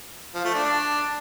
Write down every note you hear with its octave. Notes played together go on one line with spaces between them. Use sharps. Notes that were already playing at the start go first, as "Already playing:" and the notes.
F3
A3
D4